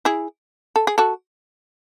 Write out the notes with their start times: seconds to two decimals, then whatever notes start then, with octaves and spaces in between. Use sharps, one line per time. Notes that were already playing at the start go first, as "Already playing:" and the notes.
0.05 E4 G#4
0.76 A4
0.87 G#4
0.98 F#4 A4